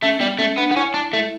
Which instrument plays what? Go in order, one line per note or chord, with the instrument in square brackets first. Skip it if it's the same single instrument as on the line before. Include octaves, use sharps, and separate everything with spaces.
[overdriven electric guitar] A3 [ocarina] C#4
[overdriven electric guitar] G3 [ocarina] B3
[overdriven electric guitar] A3 [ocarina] C#4
[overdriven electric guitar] B3 [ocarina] D4
[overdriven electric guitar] B3
[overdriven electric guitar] C#4 [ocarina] E4
[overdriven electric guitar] D4
A3